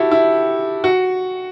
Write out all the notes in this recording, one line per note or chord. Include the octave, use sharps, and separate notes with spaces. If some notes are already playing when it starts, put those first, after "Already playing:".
Already playing: E4 F#4 G4 A4
E4
F#4